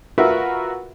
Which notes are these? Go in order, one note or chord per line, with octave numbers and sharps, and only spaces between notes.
F4 F#4 A#4 B4 E5